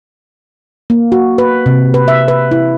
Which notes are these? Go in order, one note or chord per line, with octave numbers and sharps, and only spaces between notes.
A#3
F#4
B4
C3
B4
E5
B4
E4